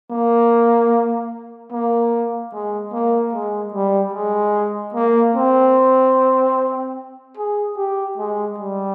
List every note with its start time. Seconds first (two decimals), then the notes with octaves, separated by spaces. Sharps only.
0.11 A#3
1.71 A#3
2.53 G#3
2.93 A#3
3.33 G#3
3.74 G3
4.14 G#3
4.94 A#3
5.35 C4
7.37 G#4
7.77 G4
8.18 G#3
8.58 G3